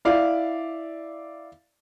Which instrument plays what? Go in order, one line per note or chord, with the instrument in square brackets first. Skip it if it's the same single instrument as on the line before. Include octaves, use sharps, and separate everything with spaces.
[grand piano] E4 D5 F5